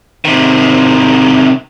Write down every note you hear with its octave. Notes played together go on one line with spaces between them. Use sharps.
C3 D#3